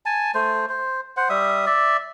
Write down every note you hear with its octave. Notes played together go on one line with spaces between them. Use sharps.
G#5 A5
A3 C5
C5
C5 F#5
G3 E5 D#6
D5 E5